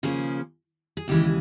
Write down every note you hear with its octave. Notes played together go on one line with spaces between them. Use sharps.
C#3 F3 A#3 C#4 G#4
G#4
D#2 C#3 E3 G#3 G4